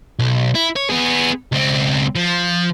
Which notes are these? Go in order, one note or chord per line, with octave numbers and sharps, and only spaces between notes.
B1
E4
C#5
B3 G#4
C#2 C4
F3